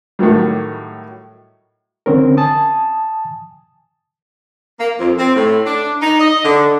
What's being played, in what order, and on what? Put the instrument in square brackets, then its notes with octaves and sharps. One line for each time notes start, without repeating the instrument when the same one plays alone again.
[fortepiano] A2 D#3 F#3 G3
[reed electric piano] D3 C4 C#4 A#4
G#5 A5 D#6
[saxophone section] A#3
F2
C4
A2
D4
D#4
D#5
D3